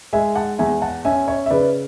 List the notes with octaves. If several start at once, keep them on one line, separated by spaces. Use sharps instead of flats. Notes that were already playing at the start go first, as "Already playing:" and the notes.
G#3 E5 G#5
F#5 A5
E2 E5 G#5
F#5 A5
C#4 E5 G#5
C#5 E5
E5
C#3 B4 D5